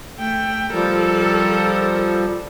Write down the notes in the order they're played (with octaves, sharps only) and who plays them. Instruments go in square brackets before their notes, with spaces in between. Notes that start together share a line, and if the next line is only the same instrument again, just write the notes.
[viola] A3 G5
[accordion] F3 G3 [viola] A4 A#4